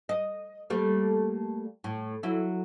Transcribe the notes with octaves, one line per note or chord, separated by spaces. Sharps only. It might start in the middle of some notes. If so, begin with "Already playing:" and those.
D#5
G3 A3 A#3
A2
F#3 E4